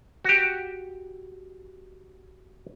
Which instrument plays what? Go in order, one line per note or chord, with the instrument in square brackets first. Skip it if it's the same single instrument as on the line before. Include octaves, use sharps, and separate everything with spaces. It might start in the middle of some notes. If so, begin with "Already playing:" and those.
[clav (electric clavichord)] F#4 G4